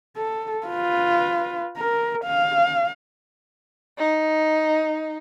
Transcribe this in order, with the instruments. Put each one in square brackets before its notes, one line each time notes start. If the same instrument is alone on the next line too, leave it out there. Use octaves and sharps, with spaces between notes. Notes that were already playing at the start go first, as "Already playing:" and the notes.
[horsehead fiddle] A4
F4 B4
A#4
F5
[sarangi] D#4